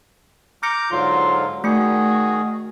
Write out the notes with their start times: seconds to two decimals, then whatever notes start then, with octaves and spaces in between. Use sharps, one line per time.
0.63 A#5 D6 F6 G6 A#6 C#7
0.91 G#2 D3 F#3 F4
1.64 D#3 A3 F#4 G#4 C#7